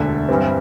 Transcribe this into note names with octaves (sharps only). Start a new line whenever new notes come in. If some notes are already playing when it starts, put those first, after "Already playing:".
Already playing: E1 D2 D3 E5
G2 E3 G3 C4